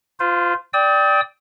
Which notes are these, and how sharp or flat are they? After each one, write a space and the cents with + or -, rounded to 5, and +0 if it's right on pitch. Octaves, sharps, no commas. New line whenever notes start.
F4 +0 C5 -35
D5 +0 G5 +0 D#6 +45